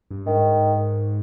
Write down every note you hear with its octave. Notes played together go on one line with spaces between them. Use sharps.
G2
G#2 D#3